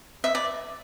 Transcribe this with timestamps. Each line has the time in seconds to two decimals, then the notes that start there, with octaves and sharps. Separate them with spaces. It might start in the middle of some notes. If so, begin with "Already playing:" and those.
0.24 E5
0.35 D5